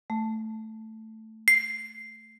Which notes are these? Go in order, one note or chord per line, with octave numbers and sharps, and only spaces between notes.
A3
C7